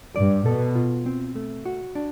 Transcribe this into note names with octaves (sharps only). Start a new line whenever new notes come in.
G2 D5
B2 A4
F4
C4
A3
F#4
D4